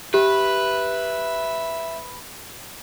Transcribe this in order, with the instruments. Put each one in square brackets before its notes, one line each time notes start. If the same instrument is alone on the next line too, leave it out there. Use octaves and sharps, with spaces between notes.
[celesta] G4 [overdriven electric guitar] B4 [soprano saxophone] E5